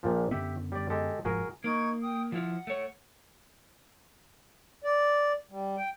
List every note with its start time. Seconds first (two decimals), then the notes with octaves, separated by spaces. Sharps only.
0.03 A#1 A#2 F3
0.31 F#2 D3 B3 G4 E5
0.72 G3 D5
0.90 G#3 G4 A4
1.25 F1 G#2 F3 F#4 G#4 A#4
1.64 A#3 D#4 C#6 G#6
2.03 G5 D#6
2.32 F3 E4 F4 F#5
2.67 A3 C#5
4.84 D5
5.51 G3
5.77 G5